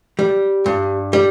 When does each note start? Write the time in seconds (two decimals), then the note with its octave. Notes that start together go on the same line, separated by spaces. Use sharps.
0.19 G3
0.66 G2
1.13 G3